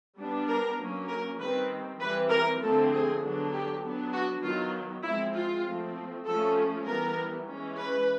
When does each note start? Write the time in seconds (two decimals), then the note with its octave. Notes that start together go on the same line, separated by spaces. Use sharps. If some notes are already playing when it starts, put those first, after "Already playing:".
0.17 G3 B3 D4
0.47 A#4
0.78 F#3 A#3 C#4
1.09 A#4
1.39 D#3 G3 C4 B4
2.00 E3 G3 C4 B4
2.30 A#4
2.60 D3 F3 A3 C4 A4
2.91 G#4
3.21 D3 F#3 B3 D4
3.52 G4
3.83 F#3 B3 D4
4.13 F#4
4.42 D#3 F#3 B3 F4
5.04 F3 G#3 C4 E4
5.34 F4
5.65 F3 A3 C4
6.26 F3 A3 C#4 A4
6.86 E3 G3 B3 A#4
7.47 E3 G#3 C#4
7.78 B4